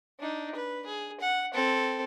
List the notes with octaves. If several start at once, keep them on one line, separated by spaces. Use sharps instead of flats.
D4 D#4
B4
G#4
F#5
C4 A4